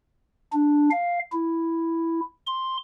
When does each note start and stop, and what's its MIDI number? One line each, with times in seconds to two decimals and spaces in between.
0.53 0.89 62
0.91 1.20 77
1.33 2.20 64
2.47 2.77 84